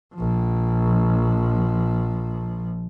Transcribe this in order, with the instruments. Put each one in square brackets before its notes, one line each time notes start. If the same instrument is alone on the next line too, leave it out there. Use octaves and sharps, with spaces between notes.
[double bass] A#1 F3